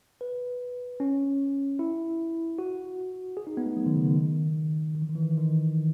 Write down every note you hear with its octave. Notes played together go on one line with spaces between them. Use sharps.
B4
C#4
E4
F#4
G#4
D#4
B3
A3
F#3
D#3
C#3
D#3
D#3
E3
D#3
E3
D#3
E3
D#3